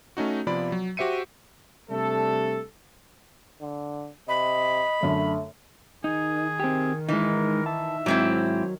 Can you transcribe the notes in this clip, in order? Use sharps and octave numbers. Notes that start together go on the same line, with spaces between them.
A3 C#4 D#4 F#4
C3 F3 B3 F4 D5 B5
F#3
F#4 G4 C5 E5 C#7 D#7
C3 G3 A3 D4 A4
D3
C3 D#5 B5
F#2 D3 A3
D#3 D#4 G#4
C4 G4
E3 G#3 D#4 A#4
E5 A5
G#2 F#3 C4 E4